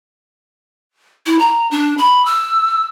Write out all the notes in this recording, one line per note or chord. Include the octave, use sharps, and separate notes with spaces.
E4
A#5
D4
B5
E6